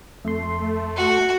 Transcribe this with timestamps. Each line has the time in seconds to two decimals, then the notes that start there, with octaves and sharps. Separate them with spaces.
0.25 F2 A3 C6
0.97 F#4